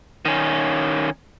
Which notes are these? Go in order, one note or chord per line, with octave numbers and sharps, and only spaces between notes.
D#3 C#4